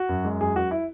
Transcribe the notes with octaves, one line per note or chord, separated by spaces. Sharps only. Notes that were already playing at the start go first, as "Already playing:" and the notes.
Already playing: F#4
F#2
G#3
F#2 G#4
F#2 F#4
E4